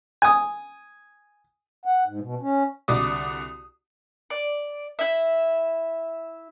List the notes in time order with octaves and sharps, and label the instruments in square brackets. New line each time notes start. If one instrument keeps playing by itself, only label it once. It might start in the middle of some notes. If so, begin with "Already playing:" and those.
[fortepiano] G#5 D#6
[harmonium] F#5
G#2
B2
C#4
[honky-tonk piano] C2 D3 F#4 D5 D6 D#6
[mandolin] D5
E4 E5